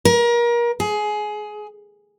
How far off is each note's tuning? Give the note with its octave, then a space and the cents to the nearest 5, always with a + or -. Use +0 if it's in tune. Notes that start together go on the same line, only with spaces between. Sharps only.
A#4 +30
G#4 +20